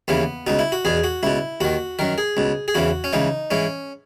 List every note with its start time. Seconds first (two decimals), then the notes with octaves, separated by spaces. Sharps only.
0.08 D#2 C#3 E3 B3
0.47 C#2 B2 D#4
0.59 E4
0.72 F#4
0.85 E2 B2 G#4
1.04 F#4
1.23 C#2 B2 E4
1.61 D#2 D#3 F#4
1.99 F#2 D#3 A#4
2.18 G#4
2.37 C#2 B2
2.68 G#4
2.75 E2 C#3 E3 F#4
3.04 C#4
3.13 C#2 C#3 E3 D#4
3.51 G#2 E3 C#4